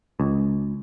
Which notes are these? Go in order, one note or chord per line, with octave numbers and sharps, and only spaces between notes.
C#2